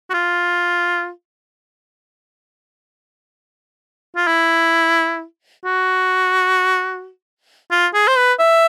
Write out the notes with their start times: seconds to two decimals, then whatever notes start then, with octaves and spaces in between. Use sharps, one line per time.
0.10 F#4
0.14 F4
4.17 F4
4.27 E4
5.65 F#4
7.71 F4
7.94 G#4
8.08 C5
8.17 B4
8.40 E5